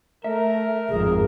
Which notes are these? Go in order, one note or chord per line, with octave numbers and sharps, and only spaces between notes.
A3 A#4 E5
G#1 F2 G#4